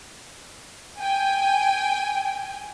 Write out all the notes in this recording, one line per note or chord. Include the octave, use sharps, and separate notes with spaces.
G5 G#5